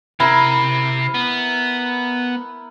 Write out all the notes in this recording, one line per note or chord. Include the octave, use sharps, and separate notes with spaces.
C3 C4 E4 A#4 B5
B3